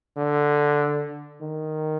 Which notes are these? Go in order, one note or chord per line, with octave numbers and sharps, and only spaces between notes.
D3
D#3